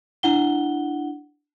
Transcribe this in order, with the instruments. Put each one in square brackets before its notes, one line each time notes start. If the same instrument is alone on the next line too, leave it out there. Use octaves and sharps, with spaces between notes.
[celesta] D4 E4 F#5 G7